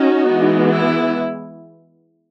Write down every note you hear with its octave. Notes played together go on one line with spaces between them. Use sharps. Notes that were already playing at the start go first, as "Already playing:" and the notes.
Already playing: C#4 D#4 F#4
E3 G#3 B3
E4